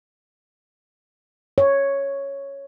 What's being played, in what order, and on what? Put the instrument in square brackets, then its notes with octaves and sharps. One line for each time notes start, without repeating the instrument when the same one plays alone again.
[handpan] C#5